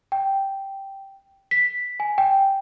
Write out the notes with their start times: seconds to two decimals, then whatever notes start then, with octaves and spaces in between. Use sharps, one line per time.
0.12 G5
1.51 B6
2.00 G#5
2.18 G5